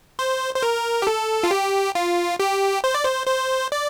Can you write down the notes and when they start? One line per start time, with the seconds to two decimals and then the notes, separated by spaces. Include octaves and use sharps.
0.19 C5
0.55 C5
0.62 A#4
1.02 G4
1.07 A4
1.43 F4
1.51 G4
1.95 F4
2.40 G4
2.84 C5
2.94 D5
3.04 C5
3.27 C5
3.72 D5